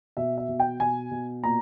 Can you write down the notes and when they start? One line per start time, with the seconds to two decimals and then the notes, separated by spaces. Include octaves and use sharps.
0.17 B2 E5
0.37 E5
0.49 B2
0.60 G5
0.80 B2 G#5
1.11 B2
1.43 A#2 A#5